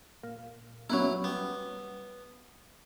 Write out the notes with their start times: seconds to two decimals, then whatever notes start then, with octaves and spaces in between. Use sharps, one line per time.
0.23 A#2
0.90 F#3 A#3 B3 C#4 E4
1.24 G3 B3